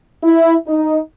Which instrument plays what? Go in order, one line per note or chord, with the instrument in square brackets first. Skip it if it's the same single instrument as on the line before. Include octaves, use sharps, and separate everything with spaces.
[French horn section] E4
D#4